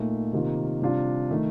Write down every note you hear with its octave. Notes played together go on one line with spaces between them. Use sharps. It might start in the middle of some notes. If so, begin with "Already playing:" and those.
Already playing: A#2 A3 D#4
C3 D#3 A#3 F4
C3 G3 D4 F4
D#3 A3